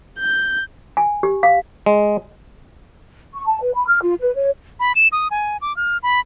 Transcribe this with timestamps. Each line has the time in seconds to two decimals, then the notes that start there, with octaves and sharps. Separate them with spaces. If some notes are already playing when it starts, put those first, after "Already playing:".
0.19 G6
0.97 G#5
1.23 G4
1.43 F5
1.86 G#3
3.33 C#6
3.46 A5
3.61 B4
3.74 B5
3.87 F6
4.02 F4
4.21 B4
4.35 C#5
4.80 B5
4.95 E7
5.12 D#6
5.31 G#5
5.61 D6
5.77 F6
6.03 B5